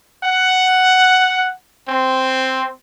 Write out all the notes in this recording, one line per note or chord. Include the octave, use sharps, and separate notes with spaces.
F#5
C4